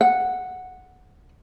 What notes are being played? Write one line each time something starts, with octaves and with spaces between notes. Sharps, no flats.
F#5